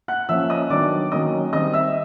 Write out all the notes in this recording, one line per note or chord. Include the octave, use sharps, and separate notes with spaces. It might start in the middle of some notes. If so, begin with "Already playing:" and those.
F#5 F#6
F3 A#3 C#4 E5 E6
D#5 D#6
D#3 F#3 B3 D4 D5 D6
D#3 F#3 A#3 C#4 D#5 D#6
D#3 G3 C4 D#5 D#6
E5 E6